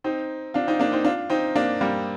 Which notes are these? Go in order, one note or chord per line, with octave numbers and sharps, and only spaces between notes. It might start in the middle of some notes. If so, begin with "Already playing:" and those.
C4 D#4
D4 F4
C4 D#4
A#3 D4
C4 D#4
D4 F4
C4 D#4
A#3 D4
G3 A#3